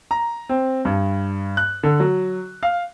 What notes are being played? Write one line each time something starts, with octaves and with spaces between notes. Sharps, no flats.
A#5
C4
G2
F#6
D3
F#3
F5